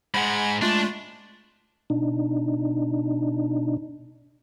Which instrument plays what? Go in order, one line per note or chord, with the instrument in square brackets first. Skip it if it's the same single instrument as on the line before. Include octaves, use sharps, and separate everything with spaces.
[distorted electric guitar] G#2 G#3 [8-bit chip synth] F#5 B5
[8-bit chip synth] G#3 A3 F4 [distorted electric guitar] D4
[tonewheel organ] B2 D4 D#4